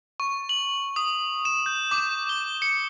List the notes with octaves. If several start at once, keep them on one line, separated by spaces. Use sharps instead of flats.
C#6
F#7
D#6
E7
G6
D6
G7
C#7